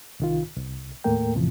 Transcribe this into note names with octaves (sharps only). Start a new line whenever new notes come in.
C2 D#3 F4
C2
D#2 A2 A3 A#3 A#4 G5
E2 A2 C3 E3 F3